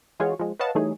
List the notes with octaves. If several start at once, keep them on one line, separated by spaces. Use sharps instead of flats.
E3 G#3 F4 F#4 G#4 C#5
F3 G#3
B4 C#5 D#5 F5 F#5 A5
E3 G3 A3 D#4 G#4 C#5